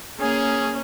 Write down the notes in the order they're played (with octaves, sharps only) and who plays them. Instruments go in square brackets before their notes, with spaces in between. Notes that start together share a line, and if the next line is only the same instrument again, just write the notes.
[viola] A#3 C#4 [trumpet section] G#4